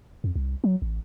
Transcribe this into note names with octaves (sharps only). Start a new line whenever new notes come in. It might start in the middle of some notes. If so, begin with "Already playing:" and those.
F2
C2
F#3
A1